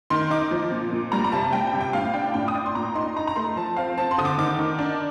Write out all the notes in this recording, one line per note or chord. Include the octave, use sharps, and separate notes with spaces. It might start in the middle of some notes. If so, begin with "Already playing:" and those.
D#3 C6
D#4 D6
F3
A#2
A#2
G3 A#5
A#5
C3 A5
G3 G5
G5
C3
G5
A2 F5
D4 G5
A2 G5
D#6
D4 D6
C6
A#2 A#5
D#4 C6
D#4 A#5
A#5
A3 C6
F3 A5
C4 F5
C4 A5
C6
D3 D#6
D6
D#3 D6
D#3
D4